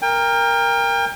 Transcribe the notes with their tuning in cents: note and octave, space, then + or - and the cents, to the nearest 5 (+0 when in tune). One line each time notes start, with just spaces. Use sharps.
A#4 +0 G5 +35